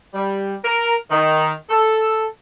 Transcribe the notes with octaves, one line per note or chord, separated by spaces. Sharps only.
G3
A#4
D#3
A4